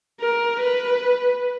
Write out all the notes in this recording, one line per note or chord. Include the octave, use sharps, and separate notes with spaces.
A#4
B4